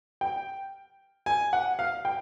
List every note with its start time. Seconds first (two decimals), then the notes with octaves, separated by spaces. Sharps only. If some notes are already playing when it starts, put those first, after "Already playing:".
0.21 G5
1.26 G#5
1.53 F#5
1.79 F5
2.05 G5